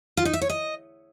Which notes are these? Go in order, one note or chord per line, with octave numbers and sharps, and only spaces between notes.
F4
D#4
E5
C#5
D#5